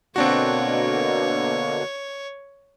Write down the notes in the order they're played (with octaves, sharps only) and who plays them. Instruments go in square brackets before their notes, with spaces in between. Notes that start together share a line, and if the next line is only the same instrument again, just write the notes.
[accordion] B2 D3 A#3 [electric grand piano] C4 D4 F#4 [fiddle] C#5